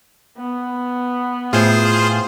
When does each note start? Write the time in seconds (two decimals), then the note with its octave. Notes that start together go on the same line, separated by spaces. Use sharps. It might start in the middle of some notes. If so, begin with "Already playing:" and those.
0.38 B3
1.53 A2 F4 G#4 C5